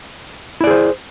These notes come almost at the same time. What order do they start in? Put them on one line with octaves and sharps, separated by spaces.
E4 D5 G#4 C5